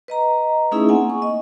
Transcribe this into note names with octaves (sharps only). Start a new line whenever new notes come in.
B4 D#5 A#5
A3 C#4 D#4 E4 G#4 E5
A#3 C4 F#5 G#5
C#6
D#5